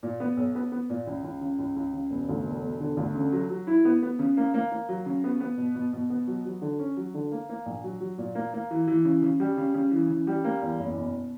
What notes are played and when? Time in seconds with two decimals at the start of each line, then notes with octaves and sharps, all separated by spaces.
0.03 A#2
0.20 B3
0.37 B1
0.55 B3
0.72 B3
0.90 A#2
1.07 C#2
1.24 C#2
1.41 C#3
1.59 C#2
1.76 C#2
1.93 C#3
2.10 E1
2.29 D2
2.45 E1
2.63 E1
2.81 D3
2.97 D2
3.15 C#3
3.32 F#3
3.50 F#3
3.67 E4
3.85 B3
4.02 B3
4.19 C#3
4.37 A#3
4.54 A#3
4.72 A#3
4.89 F#3
5.06 C#3
5.24 B3
5.40 B3
5.57 B2
5.75 B2
5.93 B2
6.10 B3
6.27 F#3
6.45 F#3
6.62 D3
6.79 C#4
6.97 F#3
7.14 D3
7.32 A#3
7.49 A#3
7.66 A#1
7.84 F#3
8.01 F#3
8.18 A#2
8.35 A#3
8.54 A#3
8.71 E3
8.87 E3
9.05 C#3
9.22 C#3
9.40 G3
9.57 C#3
9.74 C#3
9.91 E3
10.10 C#3
10.27 G3
10.44 A#3
10.61 E2
10.79 F#1
10.96 B2